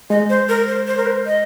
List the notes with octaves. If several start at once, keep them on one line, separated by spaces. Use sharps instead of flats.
G#3 D#5
C5
A#4
C5
C5
A#4
C5
D#5